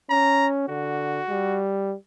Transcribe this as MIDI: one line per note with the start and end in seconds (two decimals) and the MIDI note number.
0.10 0.64 61
0.10 0.47 82
0.68 1.20 50
0.68 1.60 66
1.30 1.95 55